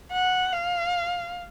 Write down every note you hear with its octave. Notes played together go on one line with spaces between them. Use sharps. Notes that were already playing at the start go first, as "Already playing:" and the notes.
F#5
F5